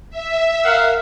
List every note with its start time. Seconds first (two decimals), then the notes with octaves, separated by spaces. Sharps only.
0.10 E5
0.64 A#4 F5 F#5